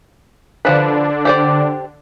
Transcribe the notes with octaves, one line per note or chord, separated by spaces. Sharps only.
D3 F3 F#3 D4 B4
G4 C5 D5